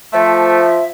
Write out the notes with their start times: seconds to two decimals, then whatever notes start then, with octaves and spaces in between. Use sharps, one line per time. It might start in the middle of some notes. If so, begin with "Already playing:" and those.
0.13 F3 A3 E5